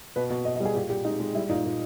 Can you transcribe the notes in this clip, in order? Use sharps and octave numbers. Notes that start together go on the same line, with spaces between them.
B2 B4
B2
B2 D#5
D#5
G3
G#4
A#2 G4
A#2 G4
G#3 D#4
G#3
G3 E4
A#2 D#4
A#2